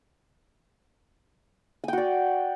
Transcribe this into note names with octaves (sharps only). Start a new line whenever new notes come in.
F#4 D5 G5 G#5